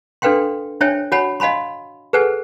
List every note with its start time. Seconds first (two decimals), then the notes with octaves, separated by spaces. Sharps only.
0.22 D4 A4 B4 F5 G5 C6
0.81 D4 C5 C#5 E5 G5 G#5
1.12 F#4 C#5 F#5 G#5 B5
1.40 D#5 F5 G#5 B5 C6
2.13 G#4 A4 B4 C5 F#5 G#5